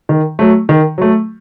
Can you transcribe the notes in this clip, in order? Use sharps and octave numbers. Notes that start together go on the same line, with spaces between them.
D#3
F#3 A3
D#3
F#3 A3